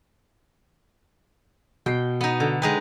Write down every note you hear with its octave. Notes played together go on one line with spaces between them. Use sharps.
B2 G5 C7
B3 D#4
D3
G#3 D#4 B4 G5